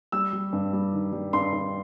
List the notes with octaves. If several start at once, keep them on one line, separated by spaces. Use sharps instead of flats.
G3 E6
G3
G2
G3
D#3
G3
G2 C6
G2